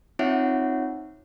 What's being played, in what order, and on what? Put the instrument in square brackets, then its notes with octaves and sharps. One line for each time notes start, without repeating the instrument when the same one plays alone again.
[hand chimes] C4 D#4 F4 C#5 E5 F#5